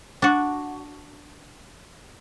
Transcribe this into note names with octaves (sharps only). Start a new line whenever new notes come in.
D4 F#4